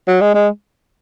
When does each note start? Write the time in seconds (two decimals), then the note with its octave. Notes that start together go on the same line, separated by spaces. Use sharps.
0.08 F#3
0.21 G#3
0.34 G#3